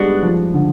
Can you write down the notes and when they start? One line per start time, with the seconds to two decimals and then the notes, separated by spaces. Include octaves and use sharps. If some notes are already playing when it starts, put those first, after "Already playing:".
Already playing: G3 G#3 B3 D4 F#4
0.23 F3
0.54 D3